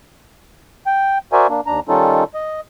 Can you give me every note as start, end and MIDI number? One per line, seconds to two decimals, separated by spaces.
0.87 1.18 79
1.33 1.47 66
1.33 1.47 70
1.33 1.47 72
1.33 1.47 74
1.33 1.47 76
1.33 1.47 80
1.49 1.61 58
1.49 1.61 62
1.66 1.80 39
1.66 1.80 62
1.66 1.80 82
1.88 2.24 51
1.88 2.24 55
1.88 2.24 61
1.88 2.24 63
1.88 2.24 65
1.88 2.24 69
2.34 2.61 75